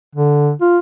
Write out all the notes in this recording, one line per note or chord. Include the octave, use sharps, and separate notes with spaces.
D3
F4